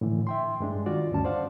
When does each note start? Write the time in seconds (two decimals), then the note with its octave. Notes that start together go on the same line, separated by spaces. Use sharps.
0.01 A2 D3 E3
0.27 E5 G5 C6
0.60 G2 G#3 D4
0.86 D#3 F4 F#4 D5
1.11 D2 G2 C#4 A5
1.25 C5 D5 F5 F#5